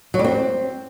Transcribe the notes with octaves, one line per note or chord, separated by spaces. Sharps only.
F#3
G3
C4